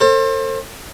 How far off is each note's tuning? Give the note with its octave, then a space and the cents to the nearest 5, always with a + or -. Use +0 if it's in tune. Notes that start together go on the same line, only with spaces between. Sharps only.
A4 +40 C5 +35